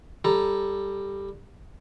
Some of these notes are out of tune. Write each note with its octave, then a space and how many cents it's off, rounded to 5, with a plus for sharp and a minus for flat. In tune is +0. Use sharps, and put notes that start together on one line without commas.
G3 +10 A4 +0 A#5 +0